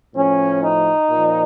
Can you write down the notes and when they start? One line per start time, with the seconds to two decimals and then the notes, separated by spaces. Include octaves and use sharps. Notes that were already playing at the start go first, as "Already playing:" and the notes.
0.15 A2 F3 C#4
0.62 D#4
1.10 A#2 F3